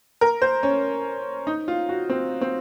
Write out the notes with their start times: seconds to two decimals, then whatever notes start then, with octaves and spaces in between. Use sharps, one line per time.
0.21 A#4
0.42 C5
0.63 C#4
1.47 D#4
1.68 F4
1.89 F#4
2.10 C4
2.41 C4